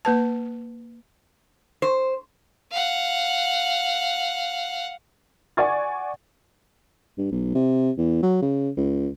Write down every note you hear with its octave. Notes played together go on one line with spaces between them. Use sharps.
A#3 B4 A5
C5
F5 F#5
D5 F#5 G#5 C#6 G#6 A6
G2
B1
C3
E2
F#3
C#3
C#2